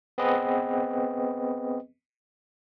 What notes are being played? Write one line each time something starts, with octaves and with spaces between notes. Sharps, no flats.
B3 C4 G#4 B4 D#5